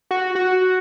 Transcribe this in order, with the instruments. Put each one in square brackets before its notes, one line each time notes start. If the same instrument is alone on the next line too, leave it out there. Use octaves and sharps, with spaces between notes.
[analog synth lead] F#4
F#4